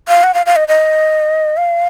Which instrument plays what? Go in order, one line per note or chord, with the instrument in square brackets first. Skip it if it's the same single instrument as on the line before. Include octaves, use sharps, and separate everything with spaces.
[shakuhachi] F5
F#5
F5
F5
D#5
D#5
F5